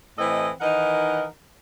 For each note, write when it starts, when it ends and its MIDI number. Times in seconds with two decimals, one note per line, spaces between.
0.18 0.49 45
0.18 0.49 52
0.18 0.49 60
0.18 0.49 69
0.18 0.49 75
0.60 1.24 51
0.60 1.24 52
0.60 1.24 63
0.60 1.24 70
0.60 1.24 75
0.60 1.24 78